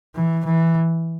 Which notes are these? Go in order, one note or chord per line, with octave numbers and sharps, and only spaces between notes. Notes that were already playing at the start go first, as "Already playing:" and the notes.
E3
E3